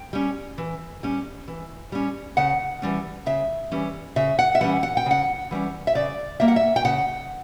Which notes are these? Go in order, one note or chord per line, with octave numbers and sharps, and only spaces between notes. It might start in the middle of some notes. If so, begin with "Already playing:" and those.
Already playing: G5
G3 C#4
E3
G3 C#4
E3
G3 C#4
C#3 F#5
E3 G3 C#4
C#3 E5
E3 G3 C#4
C#3 E5
F#5
E5
E3 G3 C#4 F#5
F#5
G5
C#3 F#5
E3 G3 C#4
E5
C#3 D5
G3 A#3 E5
F#5
E5
G5
C#3 F#5